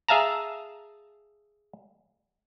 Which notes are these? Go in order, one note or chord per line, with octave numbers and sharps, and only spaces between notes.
G#4 E5 F5 A5 A#5